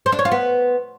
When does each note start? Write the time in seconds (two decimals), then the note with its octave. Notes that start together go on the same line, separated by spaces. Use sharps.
0.06 C5
0.12 D4
0.19 C#5
0.25 F4
0.31 B3